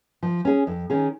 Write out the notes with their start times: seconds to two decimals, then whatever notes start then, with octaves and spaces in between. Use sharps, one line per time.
0.23 F3
0.45 C#4 G#4
0.67 F2
0.90 D#3 C#4 G#4